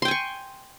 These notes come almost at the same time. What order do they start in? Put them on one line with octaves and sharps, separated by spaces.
C6 G5 G#5 C#6